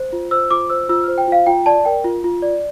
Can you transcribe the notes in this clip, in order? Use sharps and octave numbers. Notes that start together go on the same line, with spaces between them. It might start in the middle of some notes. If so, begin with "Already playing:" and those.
Already playing: C5
F4
C5 E6
F4 D6
C5 E6
F4 E6
C5 F6
G5
F4 F5
F4 G5
D5 A5
A#4 G5
F4
F4
D5